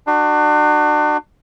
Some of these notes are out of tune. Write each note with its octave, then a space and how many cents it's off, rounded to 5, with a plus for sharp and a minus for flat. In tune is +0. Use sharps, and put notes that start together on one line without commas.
D4 +35 F#4 +15